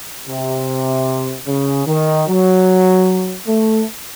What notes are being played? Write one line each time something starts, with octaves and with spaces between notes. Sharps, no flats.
C3
C#3
D#3
F#3
A3